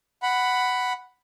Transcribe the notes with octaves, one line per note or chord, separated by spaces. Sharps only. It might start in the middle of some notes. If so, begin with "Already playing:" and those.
F#5 B5